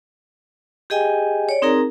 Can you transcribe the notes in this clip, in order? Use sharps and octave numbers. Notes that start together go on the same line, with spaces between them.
G4 G#4 D#5 G5 G#5
C#5 D5
C4 D#4 G#4 A#4 A#5